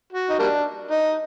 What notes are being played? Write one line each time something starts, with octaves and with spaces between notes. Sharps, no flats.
F#4
D#4
G3 A#3 D4
D#4